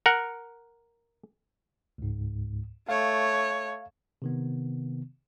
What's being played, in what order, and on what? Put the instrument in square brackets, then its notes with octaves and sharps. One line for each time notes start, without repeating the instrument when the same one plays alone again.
[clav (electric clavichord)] A#4 F#5
[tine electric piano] C#2 G#2
[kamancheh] A3 C#5 [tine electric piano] F5
[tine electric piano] C3 D#3 B3